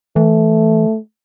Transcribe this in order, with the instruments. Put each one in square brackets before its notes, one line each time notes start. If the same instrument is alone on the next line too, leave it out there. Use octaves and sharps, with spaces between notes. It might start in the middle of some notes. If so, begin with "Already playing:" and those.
[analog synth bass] E3 [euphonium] A3